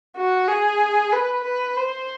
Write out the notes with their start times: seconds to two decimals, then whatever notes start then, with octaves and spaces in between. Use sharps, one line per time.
0.17 F#4
0.48 G#4
1.12 B4
1.44 B4
1.77 C5